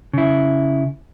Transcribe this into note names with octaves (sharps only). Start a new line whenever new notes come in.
C#3 E4